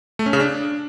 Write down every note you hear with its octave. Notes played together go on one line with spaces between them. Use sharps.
A3
C#4
C#3
D4